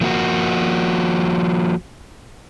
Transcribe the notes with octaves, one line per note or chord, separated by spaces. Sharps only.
F3 A#3 F#4